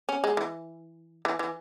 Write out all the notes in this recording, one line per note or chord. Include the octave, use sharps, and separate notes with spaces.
C#4
G#3
E3
E3
E3